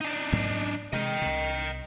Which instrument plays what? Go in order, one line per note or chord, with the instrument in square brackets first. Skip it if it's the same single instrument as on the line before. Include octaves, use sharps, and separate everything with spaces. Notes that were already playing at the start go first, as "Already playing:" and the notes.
[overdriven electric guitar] D4 D#4
[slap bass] G#2 F#3 A#3
[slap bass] C3 G#3 [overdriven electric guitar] D#5 G5
[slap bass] C2 C3